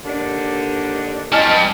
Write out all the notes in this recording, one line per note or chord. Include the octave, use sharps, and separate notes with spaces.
D#2 D3 D4
G3 D#5 G#5 A5 F6